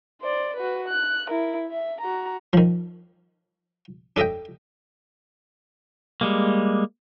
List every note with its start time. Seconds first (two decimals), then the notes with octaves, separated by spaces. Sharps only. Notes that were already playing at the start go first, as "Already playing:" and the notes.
0.22 C5 D5
0.57 F#4 B4
0.89 F#6
1.29 E4 A#4
1.68 E5
2.01 F#4 A#5
2.53 D#3 F3
4.16 D4 A4 D#5 E5 G5
6.21 G3 G#3 A#3